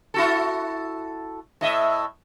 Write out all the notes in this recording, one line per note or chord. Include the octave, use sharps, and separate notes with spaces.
E4 F#4 A4
A2 D#5 E5